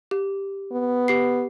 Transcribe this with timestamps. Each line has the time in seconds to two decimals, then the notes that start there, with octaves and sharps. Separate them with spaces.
0.11 G4
0.72 B3
1.08 G4 C7